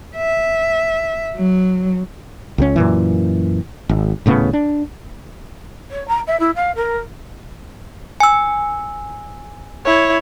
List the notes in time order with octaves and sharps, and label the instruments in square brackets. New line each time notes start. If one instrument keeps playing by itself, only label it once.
[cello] E5
F#3
[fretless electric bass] C#2 G#3 C#4
F#2 A#2 E3
G#1
D#1 A2 C#3 B3
D4
[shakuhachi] C#5
A#5
E5
E4
F5
A#4
[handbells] G#5 E6
[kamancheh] E4 C#5